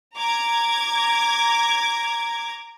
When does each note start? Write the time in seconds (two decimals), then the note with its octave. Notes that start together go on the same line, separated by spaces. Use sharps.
0.17 A#5 D6 G#6